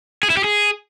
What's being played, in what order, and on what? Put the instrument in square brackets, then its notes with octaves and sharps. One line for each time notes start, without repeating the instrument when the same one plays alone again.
[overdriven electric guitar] G#4
E4
G4
G#4